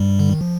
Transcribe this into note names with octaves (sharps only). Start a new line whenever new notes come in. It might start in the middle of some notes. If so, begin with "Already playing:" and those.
Already playing: G2 G3
D3
D#3
F3